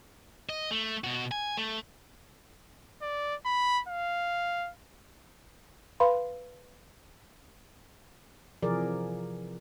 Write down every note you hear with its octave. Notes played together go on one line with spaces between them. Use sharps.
D#5
A3
B2 F#4
G#5
A3
D5
B5
F5
B4 F5 B5 C6
C3 E3 F3 G#4 A#4 D5